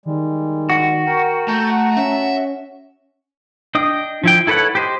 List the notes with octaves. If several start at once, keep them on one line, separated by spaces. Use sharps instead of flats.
D#3 G3 G#3
F#4
A#4 G5
A3 A5 A#5 G6
F#5
C#4 E5
D4 D#5 G5 D#6
F3 E4 G5
E4 A4 B4 C#5 F#5
G4 C5 D#5